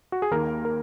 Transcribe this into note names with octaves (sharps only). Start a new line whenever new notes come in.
F#4
G#4
D#2 D#3 A#3 A#4
A#4